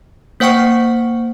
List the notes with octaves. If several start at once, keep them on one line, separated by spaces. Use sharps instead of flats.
A#3 C5 F#5 G5 C#6 C#7